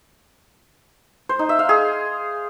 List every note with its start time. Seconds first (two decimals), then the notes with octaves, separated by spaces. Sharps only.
1.29 C5
1.39 D#4
1.49 E5
1.59 F5
1.69 G#4